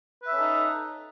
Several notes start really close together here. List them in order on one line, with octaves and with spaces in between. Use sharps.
B4 E5 C#4 A4 D#4